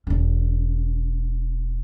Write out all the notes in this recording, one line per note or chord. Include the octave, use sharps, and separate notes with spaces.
E1 C#4